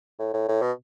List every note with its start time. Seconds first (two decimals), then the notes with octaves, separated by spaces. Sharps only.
0.19 A2
0.34 A2
0.48 A2
0.62 B2